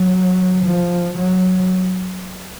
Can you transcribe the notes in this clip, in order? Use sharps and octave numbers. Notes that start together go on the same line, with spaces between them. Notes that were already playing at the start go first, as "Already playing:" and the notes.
Already playing: F#3
F3
F#3